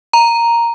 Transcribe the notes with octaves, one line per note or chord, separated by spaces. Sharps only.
A#5